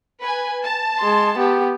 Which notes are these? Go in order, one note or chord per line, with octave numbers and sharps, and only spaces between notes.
B4 G#5
A5
G#3 C6
B3 G4